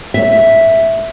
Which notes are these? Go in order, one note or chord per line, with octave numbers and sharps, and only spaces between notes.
E5